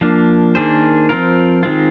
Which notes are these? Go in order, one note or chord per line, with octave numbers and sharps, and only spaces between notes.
F3 A#3 D4
D#3 A#3 D4 G#4 C5
F3 C4 F4 A#4
D#3 G#3 C4 F4